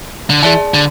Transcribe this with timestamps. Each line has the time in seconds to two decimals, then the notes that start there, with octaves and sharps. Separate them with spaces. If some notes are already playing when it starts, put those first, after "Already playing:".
0.30 D3
0.43 E3 G#4 D5 A5
0.74 D3